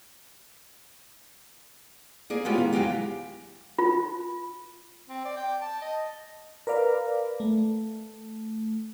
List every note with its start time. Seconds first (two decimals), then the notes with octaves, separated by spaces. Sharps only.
2.30 A#3 G#4 D5
2.45 G#3 B3 C#4 F4 G4
2.58 D#3
2.73 E2 A#2 F#3 G#3 G4 F5
3.79 F4
5.08 C4
5.25 D5
5.37 G5
5.61 A5
5.82 D#5
6.67 A#4 B4 D5 F5
7.40 A3